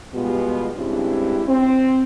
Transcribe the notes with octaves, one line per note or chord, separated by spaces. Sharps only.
B2 G3 G#3 B3 F4 G4
G2 C#3 G#3 C4 E4 G4
C4